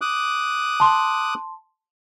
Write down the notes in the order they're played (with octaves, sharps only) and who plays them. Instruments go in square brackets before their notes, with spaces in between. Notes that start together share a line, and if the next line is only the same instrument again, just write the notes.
[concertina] D6 D#6 F#6
[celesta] A5 C6